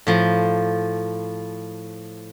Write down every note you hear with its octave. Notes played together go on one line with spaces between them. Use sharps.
A2 F3